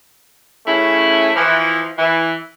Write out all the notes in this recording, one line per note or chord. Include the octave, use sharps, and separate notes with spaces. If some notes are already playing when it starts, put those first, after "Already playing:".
C#3 A3 C#4 E4
E3 F3
E3